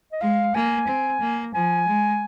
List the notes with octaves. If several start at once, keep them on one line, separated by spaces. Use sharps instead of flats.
D#5
G#3 F5
A#3 G#5
C4
A#3
F3 G#5
G#3